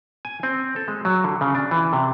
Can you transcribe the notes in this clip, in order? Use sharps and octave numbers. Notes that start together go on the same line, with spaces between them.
G#5
C4
A4
G#3
F#3
D3
C#3
D4
E3
C3